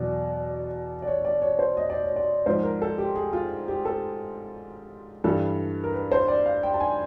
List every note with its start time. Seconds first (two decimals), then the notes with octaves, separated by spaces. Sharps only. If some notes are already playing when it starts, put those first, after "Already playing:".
Already playing: E2 B2 F#3 D5
1.02 D5
1.08 C#5
1.25 D5
1.42 C#5
1.59 C5
1.77 D#5
1.90 D5
2.04 C#5
2.16 D5
2.46 G#2 F3 C5
2.63 A#4
2.82 A4
2.98 G4
3.16 G#4
3.33 F4
3.68 G4
3.85 A4
5.24 G2 E3 G3 A4
5.84 A#4
5.94 B4
6.12 C5
6.28 D5
6.46 F5
6.63 G5
6.74 A5
6.80 G#5